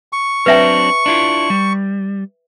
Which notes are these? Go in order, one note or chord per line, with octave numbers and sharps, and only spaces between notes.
C#6
F#3 C4 D4 B4 E5 G5
D4 E4 F4
G3